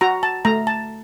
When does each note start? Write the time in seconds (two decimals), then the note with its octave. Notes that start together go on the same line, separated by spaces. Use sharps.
0.01 F#4 A#5
0.23 A5
0.45 A3 A#5
0.67 A5